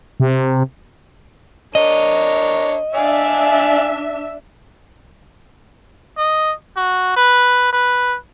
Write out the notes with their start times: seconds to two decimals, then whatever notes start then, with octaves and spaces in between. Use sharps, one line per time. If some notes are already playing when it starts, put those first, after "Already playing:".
0.20 C3
1.75 D4 A#4 C#5 D#5
2.95 D4 D5 E5 F5 G#5
6.18 D#5
6.76 F#4
7.16 B4
7.73 B4